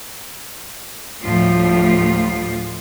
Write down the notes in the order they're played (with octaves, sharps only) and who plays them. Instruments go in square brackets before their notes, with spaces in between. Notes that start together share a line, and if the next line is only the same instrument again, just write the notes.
[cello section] D2 A2 F3 G3 F4